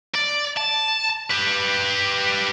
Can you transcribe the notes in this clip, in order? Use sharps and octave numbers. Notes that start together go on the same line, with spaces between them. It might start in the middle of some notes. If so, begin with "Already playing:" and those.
D5
A5
G4 B4